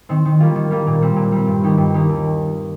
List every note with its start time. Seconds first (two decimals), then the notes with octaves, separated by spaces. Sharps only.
0.09 D#3 C4
0.25 D#3
0.40 G3 A#3 F4
0.56 D#3
0.70 G3 A#3 F4
0.87 A#2
1.02 G3 C4
1.16 A#2
1.32 G3 C4
1.47 G2
1.63 D#3 A#3 D#4 G4
1.78 G2
1.94 D#3 A#3 D#4 G4
2.09 D#2